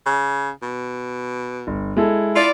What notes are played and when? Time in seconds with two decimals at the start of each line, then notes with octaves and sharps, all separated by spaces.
0.06 C#3
0.62 B2
1.67 G1
1.97 G#3 E4 A4
2.36 E4 F4 D5